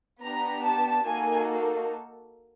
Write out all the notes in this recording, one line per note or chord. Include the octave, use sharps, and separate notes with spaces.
B3 D4 G4 A#5
A5
A#3 D#4 F#4 A4 G#5